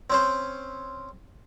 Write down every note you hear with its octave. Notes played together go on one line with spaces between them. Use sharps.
C4 C#4 C5